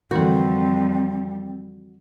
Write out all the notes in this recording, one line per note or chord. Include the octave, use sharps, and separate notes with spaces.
F2 D3 E3 G3 C4 F#4 A4